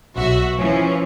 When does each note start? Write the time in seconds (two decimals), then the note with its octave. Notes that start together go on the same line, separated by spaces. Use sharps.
0.16 B1 F#4 E5
0.58 E3 F3 C#4